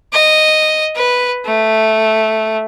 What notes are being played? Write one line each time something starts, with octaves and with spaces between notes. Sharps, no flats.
D#5
B4
A3